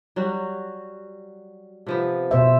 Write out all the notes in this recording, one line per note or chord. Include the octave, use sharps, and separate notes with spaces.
F#3 G3 F#4
C3 F3 B3
B2 C5 E5